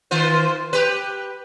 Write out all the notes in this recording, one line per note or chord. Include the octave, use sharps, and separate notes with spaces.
D#3 F4 C5
G4 B4